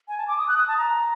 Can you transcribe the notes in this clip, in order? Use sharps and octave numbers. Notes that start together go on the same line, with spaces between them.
G#5
A5
D6
D#6
F#6
D#6
A5
A#5